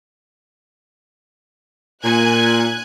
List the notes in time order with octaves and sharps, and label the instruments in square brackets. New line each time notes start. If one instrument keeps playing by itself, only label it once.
[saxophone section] A#2 [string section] G#5 F#6 G#6